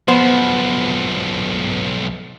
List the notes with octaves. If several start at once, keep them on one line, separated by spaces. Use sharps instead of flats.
B1 F3 B3 C5